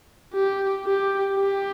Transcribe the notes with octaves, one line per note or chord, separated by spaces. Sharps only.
G4
G4
G4